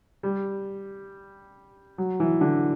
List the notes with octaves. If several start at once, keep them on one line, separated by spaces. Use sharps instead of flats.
G3
F#3
E3
D3